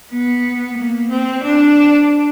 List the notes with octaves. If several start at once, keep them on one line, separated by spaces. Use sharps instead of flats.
B3
A#3
C4
D4